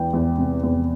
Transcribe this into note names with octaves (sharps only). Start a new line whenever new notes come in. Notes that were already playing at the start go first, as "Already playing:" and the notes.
Already playing: E2 E3 G5
E2
C3
E2